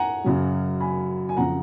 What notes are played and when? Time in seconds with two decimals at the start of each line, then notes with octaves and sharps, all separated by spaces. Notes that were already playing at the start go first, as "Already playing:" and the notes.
Already playing: F#5 G#5 A#5
0.24 F#2 C#3 F#3
0.80 G#5 B5
1.29 G#5
1.37 F2 C#3 F3 F#5 A#5